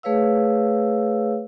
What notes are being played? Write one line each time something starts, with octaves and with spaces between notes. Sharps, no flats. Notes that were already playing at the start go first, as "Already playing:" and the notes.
A3 G#4 B4 C#5 F5 E6